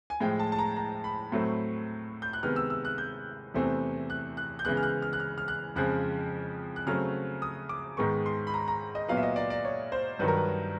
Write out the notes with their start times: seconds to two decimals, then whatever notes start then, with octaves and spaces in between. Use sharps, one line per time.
0.10 G#5
0.20 A2 F3 G#3 G5
0.39 A5
0.52 A5
0.59 A#5
0.77 A#5
1.04 B5
1.32 A2 F#3 A3 C4
2.22 G6
2.33 F#6
2.43 C3 D#3 G#3 B3 F6
2.56 E6
2.70 E6
2.85 F#6
2.98 G6
3.54 E2 C3 E3 A3 C4
4.10 F#6
4.37 F#6
4.59 G6
4.65 C#3 E3 G#3 B3 F#6
4.77 F6
4.83 F#6
5.02 F6
5.13 F#6
5.20 F6
5.38 F6
5.48 F#6
5.75 F2 C#3 F3 G#3 F#6
6.76 F#6
6.86 C#3 F#3 A3 C4 F6
7.42 D#6
7.69 D6
7.97 G#2 D#3 G#3 B3 C#6
8.26 C6
8.47 B5
8.54 A#5
8.68 A#5
8.95 D#5
9.08 A#2 F#3 B3 F5
9.17 E5
9.23 D#5
9.36 D5
9.50 D5
9.65 C#5
9.92 C5
10.19 G2 D#3 F#3 B4
10.28 A#4
10.37 B4